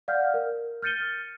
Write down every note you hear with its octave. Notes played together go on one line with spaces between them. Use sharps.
D5 F5 F#5 F6 G6
A#4
F6 G6 A6 C#7 D#7 G7